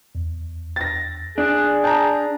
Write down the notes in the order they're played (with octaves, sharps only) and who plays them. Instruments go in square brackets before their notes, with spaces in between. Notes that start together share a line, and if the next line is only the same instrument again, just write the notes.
[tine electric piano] E2
[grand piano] A6 A#6
[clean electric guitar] D4 [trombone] G#4
[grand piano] A5 A#5 [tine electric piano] G6